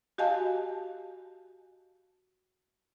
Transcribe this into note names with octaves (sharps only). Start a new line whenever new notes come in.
F#4 G4 D#5 F5 G#5 A5